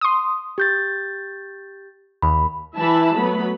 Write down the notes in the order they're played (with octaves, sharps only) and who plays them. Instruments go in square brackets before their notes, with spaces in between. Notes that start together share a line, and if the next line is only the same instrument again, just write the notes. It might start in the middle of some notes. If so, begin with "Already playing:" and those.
[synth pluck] C6 D#6
[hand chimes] G4 G6 A6
[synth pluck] D#2 [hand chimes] B5
[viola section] E3 E4 E5 A5 B5
F#3 A3 B3 B5